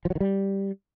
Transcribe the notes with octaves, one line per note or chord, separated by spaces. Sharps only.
F3
F#3
D#3
G3